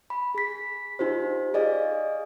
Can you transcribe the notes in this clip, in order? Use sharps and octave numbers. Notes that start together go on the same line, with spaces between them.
B5
G#4 B6
D#4 F4 G4 C5
G#4 D5 D#5 F5